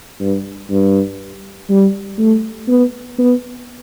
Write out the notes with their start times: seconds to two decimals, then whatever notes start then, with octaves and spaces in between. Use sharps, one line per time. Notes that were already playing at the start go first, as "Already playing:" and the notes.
0.20 G2
0.70 G2
1.70 G3
2.18 A3
2.68 B3
3.19 B3